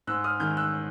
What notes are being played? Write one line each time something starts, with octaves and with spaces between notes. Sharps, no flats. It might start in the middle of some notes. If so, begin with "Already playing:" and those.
G#2 E6 F#6
D#6 F6
D#3 G#3 F6 G6
E6 F#6